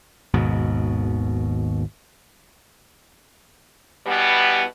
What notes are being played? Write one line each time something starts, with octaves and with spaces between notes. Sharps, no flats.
G#1 D#2 G#2 B2
B2 E3 G3 B3